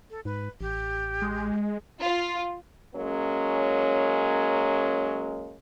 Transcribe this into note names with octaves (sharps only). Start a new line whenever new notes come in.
A4
G#2 B4
A1 G4
G#3
F4
F#3 G#3 A#3 C#4